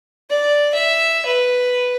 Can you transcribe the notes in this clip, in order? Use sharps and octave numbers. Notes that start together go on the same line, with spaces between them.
D5
E5
B4